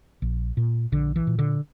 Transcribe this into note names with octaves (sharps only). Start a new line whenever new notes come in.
A#1
A#2
A#1 D3
E3
A#2
D3